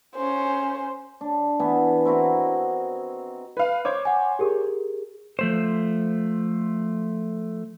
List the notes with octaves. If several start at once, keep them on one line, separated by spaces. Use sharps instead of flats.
C#4 C5
D4
E3 B3 G#5 A5
C4 E4 F#4 A#4
D#5
B4 F5
C5 C#5 D6
F#5 G#5
G4 G#4 A#4
F3 A3 C5